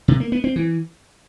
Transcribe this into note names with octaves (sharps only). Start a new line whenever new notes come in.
C3
A#3
B3
C4
E3